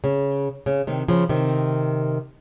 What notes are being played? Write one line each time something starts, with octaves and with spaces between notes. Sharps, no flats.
C#3
C#3
C3 D#3
C#3 F3
C3 D#3